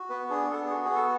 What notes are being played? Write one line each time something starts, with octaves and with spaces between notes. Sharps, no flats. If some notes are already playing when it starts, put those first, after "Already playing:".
Already playing: F#4
B3 B4
D4 G#4
B3 A4
F#4 G#4
G#4
B3
A4